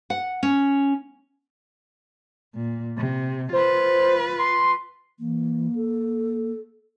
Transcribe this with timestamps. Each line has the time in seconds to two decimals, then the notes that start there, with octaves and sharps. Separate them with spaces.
0.10 F#5
0.43 C#4
2.54 A#2
2.97 C3
3.53 F4 B4 C5
4.39 C6
5.19 E3 A#3
5.75 A4